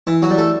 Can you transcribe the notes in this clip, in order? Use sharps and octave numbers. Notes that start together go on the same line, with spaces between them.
E3 E4
F#3 F#4
G3
A3 A4